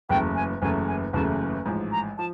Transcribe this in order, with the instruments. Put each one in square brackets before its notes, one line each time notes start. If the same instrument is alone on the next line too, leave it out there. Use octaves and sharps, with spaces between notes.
[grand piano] F#1 E2 C#3 F#3 A3 [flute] G5
[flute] G#5
[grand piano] F#1 E2 C#3 F#3 A3 [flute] G#5
[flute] G#5
[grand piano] F#1 E2 C#3 F#3 A3 [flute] A5
[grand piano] A1 G#2 F3
[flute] A#5
[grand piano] F3 [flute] A5